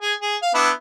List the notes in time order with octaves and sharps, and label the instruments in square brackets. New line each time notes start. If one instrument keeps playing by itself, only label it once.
[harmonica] G#4 G#5
G#4
F5
B3 D4 E4